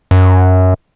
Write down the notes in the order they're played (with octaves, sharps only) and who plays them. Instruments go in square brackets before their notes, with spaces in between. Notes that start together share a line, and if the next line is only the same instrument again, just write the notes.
[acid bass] F#2